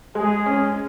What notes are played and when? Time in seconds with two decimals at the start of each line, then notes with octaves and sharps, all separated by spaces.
0.15 G#3 G#4
0.46 C#4